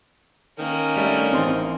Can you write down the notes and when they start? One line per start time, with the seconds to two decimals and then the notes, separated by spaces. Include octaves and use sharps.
0.59 D#3 A#3 C#4
0.96 G3 A3 D4
1.33 A1 C4 D#4 C6